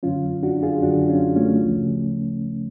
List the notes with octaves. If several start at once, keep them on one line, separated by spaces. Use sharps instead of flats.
F#2 D3 F#3 C#4 F4
D4 F#4
F4 G#4
F#2 D3 F#3 D4 F#4
C#4 F4
A3 C#4
D2 C#3 F3